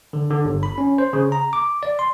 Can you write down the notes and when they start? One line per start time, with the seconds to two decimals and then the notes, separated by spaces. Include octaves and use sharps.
0.13 D3
0.30 D3
0.45 G1
0.63 B5
0.78 C#4
0.98 C5
1.13 C#3
1.32 A#5
1.53 D6
1.83 D5
1.99 C6